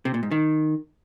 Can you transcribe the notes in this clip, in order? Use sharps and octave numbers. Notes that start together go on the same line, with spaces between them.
C3
A#2
G#2
D#3